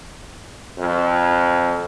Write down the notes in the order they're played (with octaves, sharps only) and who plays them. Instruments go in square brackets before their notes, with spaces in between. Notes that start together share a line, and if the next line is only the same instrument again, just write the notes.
[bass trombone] F2